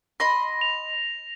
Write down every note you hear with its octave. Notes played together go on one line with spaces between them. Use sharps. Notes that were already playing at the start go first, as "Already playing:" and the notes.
D#5 B5 C6 A#6
F7